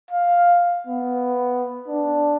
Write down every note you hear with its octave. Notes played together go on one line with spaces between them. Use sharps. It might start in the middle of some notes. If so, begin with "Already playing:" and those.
F5
B3
D4